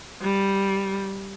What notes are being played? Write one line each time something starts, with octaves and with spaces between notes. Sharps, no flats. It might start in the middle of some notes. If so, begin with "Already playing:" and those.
G3